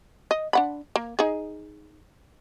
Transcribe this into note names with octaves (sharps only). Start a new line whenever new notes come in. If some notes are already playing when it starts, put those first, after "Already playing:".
D#5
D4 F#5 B5
A#3
D#4 G#4